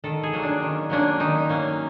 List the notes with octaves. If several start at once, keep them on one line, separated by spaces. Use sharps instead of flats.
D#3 A4
G#4
F#3 A#3 C#4
D4
D#3
F#3 A#3 C#4 D4
D#3 D#4
F#3 A#3 C#4